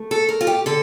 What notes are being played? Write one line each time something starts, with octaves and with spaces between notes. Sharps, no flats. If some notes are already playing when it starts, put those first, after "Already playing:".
Already playing: A3
A4
A#4
F4
G4
D3 A4